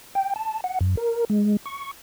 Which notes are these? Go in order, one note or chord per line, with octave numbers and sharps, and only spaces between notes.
G5
A5
F#5
F#2
A#4
G#3
C#6